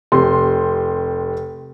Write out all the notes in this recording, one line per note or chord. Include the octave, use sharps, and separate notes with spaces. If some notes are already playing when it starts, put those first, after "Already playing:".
F1 G4 C6